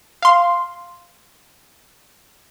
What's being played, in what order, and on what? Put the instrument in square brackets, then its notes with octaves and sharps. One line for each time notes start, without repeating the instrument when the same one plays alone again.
[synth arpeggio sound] F5 C6